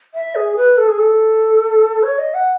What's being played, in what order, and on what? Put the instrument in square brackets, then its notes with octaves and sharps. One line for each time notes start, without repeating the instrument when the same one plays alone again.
[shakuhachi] E5
G#4
B4
A4
G#4
A4
C#5
D#5
F#5